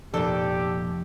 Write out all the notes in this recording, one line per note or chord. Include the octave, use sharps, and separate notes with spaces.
F1 A#2 G4 A4 D5 G6